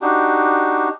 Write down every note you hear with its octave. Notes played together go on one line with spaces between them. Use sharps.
D4 D#4 F#4 G4